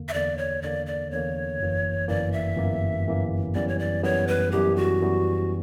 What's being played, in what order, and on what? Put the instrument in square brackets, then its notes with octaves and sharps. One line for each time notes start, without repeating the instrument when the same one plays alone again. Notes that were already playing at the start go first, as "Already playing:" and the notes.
Already playing: [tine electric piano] E2 D3 A#3
[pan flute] E5
[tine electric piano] E2 D3 A#3 [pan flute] D5
[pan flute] C#5
[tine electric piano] E2 D3 A#3 [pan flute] D5
[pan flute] D5
[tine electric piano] E2 D3 A#3 [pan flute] C#5
[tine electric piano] G1 F#2 E3 A#3
[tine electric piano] G1 F#2 E3 A#3 [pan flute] D5
[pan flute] E5
[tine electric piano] G1 F#2 E3 A#3
G1 F#2 E3 A#3
[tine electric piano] F#2 E3 G3 B3 [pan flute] D5
[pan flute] C#5
D5
[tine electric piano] F#2 E3 G3 B3 [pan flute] C#5
[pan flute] B4
[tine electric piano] F#2 E3 G3 B3 [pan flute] G4
[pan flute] F#4
[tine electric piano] F#2 E3 G3 B3